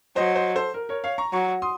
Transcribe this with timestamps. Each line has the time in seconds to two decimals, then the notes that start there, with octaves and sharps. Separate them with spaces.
0.16 F#3 C5 D#5
0.35 C5 D#5
0.55 A4 C5
0.74 A#4
0.89 A#4 C#5
1.04 C#5 F5
1.18 A#5 C#6
1.33 F#3 A#5 C#6
1.62 C6 D#6